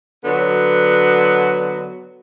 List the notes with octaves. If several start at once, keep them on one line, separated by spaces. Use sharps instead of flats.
D3 F#3 B3